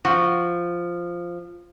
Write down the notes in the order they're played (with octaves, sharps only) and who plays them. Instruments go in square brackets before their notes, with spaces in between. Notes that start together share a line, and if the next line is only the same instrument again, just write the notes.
[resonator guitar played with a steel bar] F3 [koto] F#4